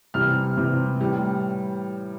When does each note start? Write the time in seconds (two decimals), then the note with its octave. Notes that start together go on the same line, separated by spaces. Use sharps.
0.14 C3 E3 G3 F6
0.57 C3 E3 G3
1.01 A2 E3 G3